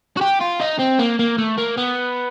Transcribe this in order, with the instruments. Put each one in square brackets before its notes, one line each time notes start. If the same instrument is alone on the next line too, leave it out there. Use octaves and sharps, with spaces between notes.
[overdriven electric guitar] F#4
G4
F4
D#4
C4
A#3
A#3
A3
A#3
B3